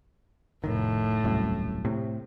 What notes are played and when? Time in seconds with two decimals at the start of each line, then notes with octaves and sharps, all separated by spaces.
0.64 F1 A2 D#3
1.24 D#1 C2 F#2
1.85 A2 C3